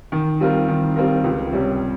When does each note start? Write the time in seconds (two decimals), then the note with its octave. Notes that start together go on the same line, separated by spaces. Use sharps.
0.12 D#3
0.40 G3 C4 F4 A#4
0.68 D#3
0.96 G3 C4 F4 A#4
1.24 C#2
1.52 C3 G3 C#4